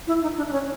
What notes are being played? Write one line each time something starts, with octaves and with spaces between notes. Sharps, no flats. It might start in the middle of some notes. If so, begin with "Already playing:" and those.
E4
D#4
D4
D4
C#4